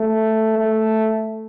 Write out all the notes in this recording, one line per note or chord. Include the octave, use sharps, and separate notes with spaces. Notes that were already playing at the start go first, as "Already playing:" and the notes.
Already playing: A3
A3